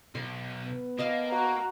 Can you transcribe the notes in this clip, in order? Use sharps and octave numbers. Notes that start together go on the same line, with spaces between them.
B1 C6
B3
A#3 D#5 F5 A5
F#4 A#5